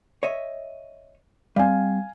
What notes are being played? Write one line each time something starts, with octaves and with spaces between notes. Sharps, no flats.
C#5 D#5 E5
G3 C4 F5 G#5